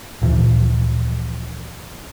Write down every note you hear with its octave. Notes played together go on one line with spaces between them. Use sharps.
D2 A#2 E3 F3